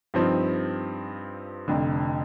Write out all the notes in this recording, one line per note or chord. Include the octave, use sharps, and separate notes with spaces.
G2 F3 C4 D#4
F1 F2 D3